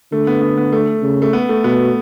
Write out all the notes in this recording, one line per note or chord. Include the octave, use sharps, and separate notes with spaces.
D3 A3
B3
B3
B3
A3
C#3
A3
B3
A3
B2 B3